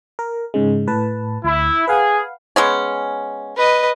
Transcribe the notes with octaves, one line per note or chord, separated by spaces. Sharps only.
A#4
G#2 C#3 G#3
A2 B4 A5
D2 E4
G#4 B4 F5 F#5
G#3 B3 C#4
B4 D#5